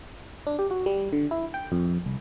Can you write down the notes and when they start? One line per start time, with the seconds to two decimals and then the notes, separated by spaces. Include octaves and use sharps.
0.47 D4
0.59 G4
0.71 F#4
0.86 G3
1.13 D3
1.31 E4
1.54 G5
1.72 F2
2.06 C2